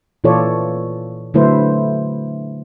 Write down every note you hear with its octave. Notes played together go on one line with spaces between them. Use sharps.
A#2 E3 F4 A4 C#5 D5
D3 F#3 A3 E4 B4 C5